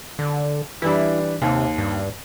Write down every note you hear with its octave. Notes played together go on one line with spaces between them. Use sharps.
D3
E3 G3 D4 E4
D#2 C3
G2